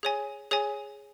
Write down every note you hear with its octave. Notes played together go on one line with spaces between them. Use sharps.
G#4 C#5 G#5
G#4 C#5 G#5